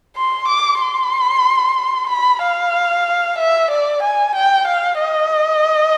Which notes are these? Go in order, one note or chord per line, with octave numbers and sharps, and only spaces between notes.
C6
D6
C6
B5
F5
E5
D5
G#5
G5
F5
D#5